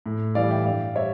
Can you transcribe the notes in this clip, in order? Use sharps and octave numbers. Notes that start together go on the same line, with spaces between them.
A2
E3 G3 D5 F5
E5 G5
G2 D5 F5
G3 C#5 E5